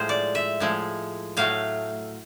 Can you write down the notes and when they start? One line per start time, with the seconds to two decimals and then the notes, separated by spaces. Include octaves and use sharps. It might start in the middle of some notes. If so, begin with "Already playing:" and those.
Already playing: A2 F3 G#3 C5
0.09 D5
0.35 E5
0.60 A2 F3 G#3
1.37 A2 F#3 A3 F5